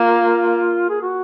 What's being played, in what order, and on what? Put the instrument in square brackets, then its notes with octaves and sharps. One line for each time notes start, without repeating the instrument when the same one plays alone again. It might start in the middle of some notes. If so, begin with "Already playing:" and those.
Already playing: [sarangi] A#3 [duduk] F4
[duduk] G#4
F#4